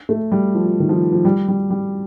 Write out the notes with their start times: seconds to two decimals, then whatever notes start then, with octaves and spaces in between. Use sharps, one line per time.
0.09 A3
0.32 G3
0.54 F3
0.80 D#3
0.89 F3
1.13 F3
1.25 G3
1.48 G3
1.70 G3